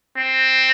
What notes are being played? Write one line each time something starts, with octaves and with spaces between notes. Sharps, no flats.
C4